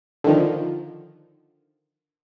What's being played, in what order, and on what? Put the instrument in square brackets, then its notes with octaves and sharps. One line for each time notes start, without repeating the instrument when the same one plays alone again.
[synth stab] D3 D#3 F3